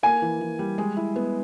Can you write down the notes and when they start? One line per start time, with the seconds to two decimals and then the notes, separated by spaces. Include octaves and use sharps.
0.03 A#3 G#5
0.22 E3
0.41 E3
0.59 G3
0.78 G#3
0.97 E4
1.16 B3